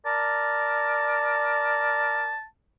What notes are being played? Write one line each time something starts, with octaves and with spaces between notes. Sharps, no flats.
A#4 D5 A5